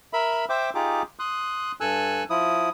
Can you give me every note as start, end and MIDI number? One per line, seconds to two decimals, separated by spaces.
0.13 0.45 70
0.13 0.45 76
0.13 0.45 83
0.50 0.70 72
0.50 0.70 76
0.50 0.70 79
0.50 0.70 86
0.75 1.02 63
0.75 1.02 65
0.75 1.02 67
0.75 1.02 68
0.75 1.02 86
1.19 1.72 84
1.19 1.72 87
1.19 1.72 90
1.81 2.24 43
1.81 2.24 69
1.81 2.24 80
1.81 2.24 88
1.81 2.24 90
2.30 2.69 53
2.30 2.69 64
2.30 2.69 87